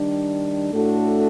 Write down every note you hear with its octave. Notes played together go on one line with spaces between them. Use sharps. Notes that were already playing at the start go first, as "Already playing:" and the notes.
Already playing: D#3 G3 D4
A2 A3 D4 F#4 A4